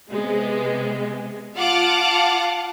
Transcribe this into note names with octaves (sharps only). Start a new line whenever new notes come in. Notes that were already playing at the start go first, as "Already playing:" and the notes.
C3 G#3 B3
F4 F5 F#5 A5 D6